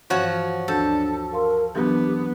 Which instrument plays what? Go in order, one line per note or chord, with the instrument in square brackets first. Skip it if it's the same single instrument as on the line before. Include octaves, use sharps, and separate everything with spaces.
[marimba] G2 E3 [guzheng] F3 F#4 C#5
[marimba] D2 F#4 G6 [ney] D4 [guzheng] A4
[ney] A#4 [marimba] F5 C6
[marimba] E3 F#3 D4 [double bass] B3 [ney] G4